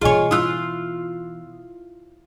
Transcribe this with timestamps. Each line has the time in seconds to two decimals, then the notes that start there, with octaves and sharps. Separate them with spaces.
0.02 B2 E3 F4 G#4 C#5 D#5 G#5
0.31 E4 F4 D#6 E6 F#6